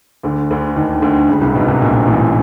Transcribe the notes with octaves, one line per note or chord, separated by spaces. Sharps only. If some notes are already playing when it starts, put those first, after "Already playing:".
D2 D3
D2 D3
D#2 D#3
D2 D3
C#2 C#3
C2 C3
B1 B2
C2 C3
A#1 A#2
A1 A2